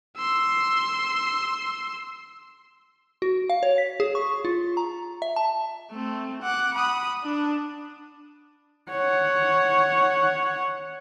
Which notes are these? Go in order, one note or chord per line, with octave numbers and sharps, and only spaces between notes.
C6 E6
F#4
F5
C#5
B6
G#4
C#6
F4
A#5
E5
A5
A3 C4
F#5 D6
B5 D#6
D4
C#5 F#5